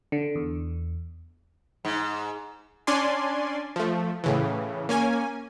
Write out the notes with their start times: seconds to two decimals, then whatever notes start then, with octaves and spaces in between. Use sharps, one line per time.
0.12 D3
0.35 E2
1.85 G#2
2.87 C#4 D4 D5 G#5 C6
3.76 F3 A3
4.24 A2 C#3 E3
4.89 A#3 C#4 G#5